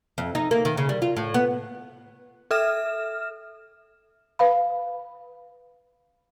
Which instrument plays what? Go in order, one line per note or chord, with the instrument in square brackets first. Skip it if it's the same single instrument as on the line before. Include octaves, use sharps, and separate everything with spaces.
[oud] F2
D#4
A#3
D#3
C#3
G3
F4
A2
B3
[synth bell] A4 E5 F6 E7
[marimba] B4 F5 B5